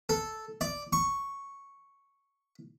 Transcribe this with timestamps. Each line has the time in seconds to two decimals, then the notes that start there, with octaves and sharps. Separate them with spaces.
0.09 A4
0.61 D5
0.93 C#6